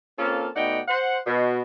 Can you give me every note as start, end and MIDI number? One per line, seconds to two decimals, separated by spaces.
0.19 0.48 58
0.19 0.48 60
0.19 0.48 61
0.19 0.48 65
0.19 0.48 69
0.56 0.79 47
0.56 0.79 57
0.56 0.79 63
0.56 0.79 74
0.56 0.79 78
0.56 0.79 79
0.88 1.18 72
0.88 1.18 78
1.27 1.62 47